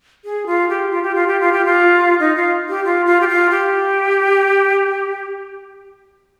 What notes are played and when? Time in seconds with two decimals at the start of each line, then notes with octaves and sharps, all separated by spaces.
0.25 G#4
0.46 F4
0.69 G4
0.90 F4
1.03 G4
1.15 F4
1.27 G4
1.40 F4
1.53 G4
1.65 F4
2.20 D#4
2.36 F4
2.69 G4
2.85 F4
3.06 F4
3.21 G4
3.28 F4
3.50 G4